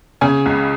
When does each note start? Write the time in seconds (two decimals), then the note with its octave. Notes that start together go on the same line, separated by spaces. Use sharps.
0.21 C#3 G#5
0.46 C#2